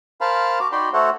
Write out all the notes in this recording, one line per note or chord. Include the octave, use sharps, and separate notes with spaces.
A#4 C5 F5 A5 B5
F#4 D6
D#4 F#4 D5 G5 B5 C6
A3 F#4 A4 C5 C#5 F#5